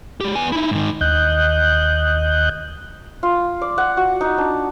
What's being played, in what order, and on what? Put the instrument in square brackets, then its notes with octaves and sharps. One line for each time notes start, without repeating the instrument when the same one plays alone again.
[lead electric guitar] G#3 G4
B3 G#5
D#4 E4
G#2 D#3
[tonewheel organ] D#2 D#5 F#6 G6
[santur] F4
D5
F#5
F#4
D#4
D4